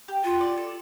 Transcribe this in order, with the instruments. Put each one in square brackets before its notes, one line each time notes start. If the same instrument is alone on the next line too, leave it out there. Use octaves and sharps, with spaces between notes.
[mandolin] G4
[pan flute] F4 [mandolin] F#4
[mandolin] D5
A4